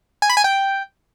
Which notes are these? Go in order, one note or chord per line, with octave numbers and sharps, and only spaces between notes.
G#5
B5
G#5
G5